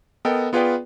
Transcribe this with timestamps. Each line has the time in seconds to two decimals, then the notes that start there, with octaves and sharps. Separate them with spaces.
0.25 B3 A4 A#4 D#5 G5
0.53 B3 F4 G#4 B4 D5 G5